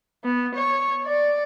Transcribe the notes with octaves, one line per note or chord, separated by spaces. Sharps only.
B3
C#5
D5